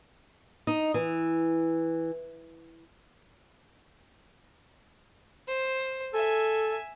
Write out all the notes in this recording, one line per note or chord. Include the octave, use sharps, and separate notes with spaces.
D#4
E3
C5
A4 E5 G#5